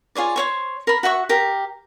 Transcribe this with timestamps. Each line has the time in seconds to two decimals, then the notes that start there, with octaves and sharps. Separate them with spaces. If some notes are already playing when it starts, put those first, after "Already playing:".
0.15 F4 G#4 C#5 D5
0.36 C5 C#5 C#6
0.87 A#4 B5
1.03 F#4 E5 F#5 C#6
1.29 G4 A#4